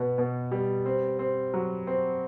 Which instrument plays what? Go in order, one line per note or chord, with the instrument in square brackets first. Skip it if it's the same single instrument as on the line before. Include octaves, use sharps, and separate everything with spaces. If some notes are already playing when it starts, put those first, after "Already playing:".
Already playing: [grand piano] B2 B3
B2
G3
C4
C4
F#3
C4